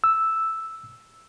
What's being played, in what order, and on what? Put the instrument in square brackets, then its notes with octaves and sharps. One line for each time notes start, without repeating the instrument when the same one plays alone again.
[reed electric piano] E6